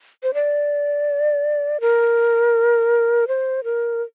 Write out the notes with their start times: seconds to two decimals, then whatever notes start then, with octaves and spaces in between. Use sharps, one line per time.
0.23 C5
0.34 D5
1.81 A#4
3.28 C5
3.64 A#4